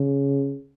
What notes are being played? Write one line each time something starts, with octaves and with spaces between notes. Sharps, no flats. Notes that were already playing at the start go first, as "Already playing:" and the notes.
Already playing: C#3